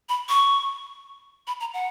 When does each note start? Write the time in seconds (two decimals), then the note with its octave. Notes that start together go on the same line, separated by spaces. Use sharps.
0.09 B5
0.29 C#6
1.47 B5
1.60 A#5
1.74 F#5